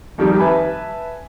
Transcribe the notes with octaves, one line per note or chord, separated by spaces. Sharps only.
F2 D#3 G3 D#4
B4 E5 G#5 A5 B5